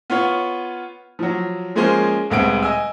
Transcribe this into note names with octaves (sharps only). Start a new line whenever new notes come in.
B3 F4 C#5
F3 F#3
F3 G#3 A#3 C#4 G#4 C5
D#1 D2 G#3 B3 C4 D7
D#5 G#5 E6